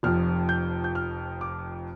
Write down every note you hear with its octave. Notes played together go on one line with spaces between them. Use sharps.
F1 F2 F3 F6
G6
G6
F6
D6